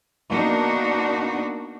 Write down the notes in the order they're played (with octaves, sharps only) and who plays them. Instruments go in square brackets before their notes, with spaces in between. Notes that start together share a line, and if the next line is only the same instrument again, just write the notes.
[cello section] A#3 B3 D4 D#4 F#4